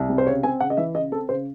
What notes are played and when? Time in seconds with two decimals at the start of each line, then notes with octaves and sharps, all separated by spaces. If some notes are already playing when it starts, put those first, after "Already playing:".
Already playing: C2
0.09 C3
0.18 C5
0.27 C#3 C#5
0.43 C4 G#5
0.60 C#3 F#5
0.70 D#5
0.77 E3 E5
0.95 C#3 D#5
1.12 C4 A4
1.29 C#3 C5